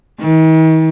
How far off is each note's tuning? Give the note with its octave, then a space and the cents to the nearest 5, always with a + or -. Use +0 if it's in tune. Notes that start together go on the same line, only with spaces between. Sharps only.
D#3 +45